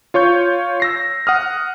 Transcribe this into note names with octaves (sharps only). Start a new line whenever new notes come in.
F4 C#5 C#6 G6
E6 A#6 C7
F#5 D#6 F6